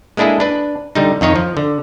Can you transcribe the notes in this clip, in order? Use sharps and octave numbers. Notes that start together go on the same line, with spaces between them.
G#3 A#3 D4 E4 G#4 A4
D4 B4
D3 G3 D#4
F2 D#3 D#4 C#5
F3
D3